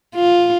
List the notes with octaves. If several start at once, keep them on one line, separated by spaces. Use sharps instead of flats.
F4